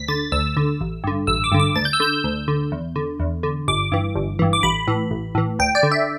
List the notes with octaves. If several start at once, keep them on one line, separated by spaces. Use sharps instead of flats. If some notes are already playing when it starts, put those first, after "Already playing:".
Already playing: D2 B6
D3 A6
D2 E6
D3
A1
G2 D3
A1 E6
D6
G2 D3
D6
D2 A6
G6
E6
D3 G6
D2
D3
E2
D3
E2
D3
G1 D6
G2 E3
G1
G2 E3
D6
A1 B5
A2 E3
A1
A2 E3
D2 G5
D5
D3
E5